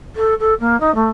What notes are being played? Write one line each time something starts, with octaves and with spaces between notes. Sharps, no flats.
A4
A4
A#3
D#4
A3